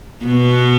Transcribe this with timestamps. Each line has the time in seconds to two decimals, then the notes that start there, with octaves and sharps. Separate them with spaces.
0.25 B2 B3